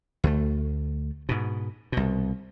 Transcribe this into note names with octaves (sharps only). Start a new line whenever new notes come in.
D2 A3
G#2 B2
C2 B2